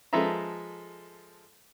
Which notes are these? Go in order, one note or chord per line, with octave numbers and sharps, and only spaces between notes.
F3 G#3 A4 B4 E5 A#5